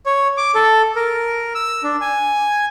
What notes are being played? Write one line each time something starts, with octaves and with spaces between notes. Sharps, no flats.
C#5
D6
A4
A#4
E6
D4
G#5